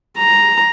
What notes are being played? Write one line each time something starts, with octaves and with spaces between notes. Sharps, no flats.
A#5